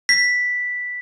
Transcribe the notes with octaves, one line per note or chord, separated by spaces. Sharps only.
B6